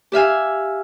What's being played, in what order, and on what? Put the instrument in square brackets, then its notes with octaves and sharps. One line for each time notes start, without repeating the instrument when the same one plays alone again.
[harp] G4 E5 F5 G#5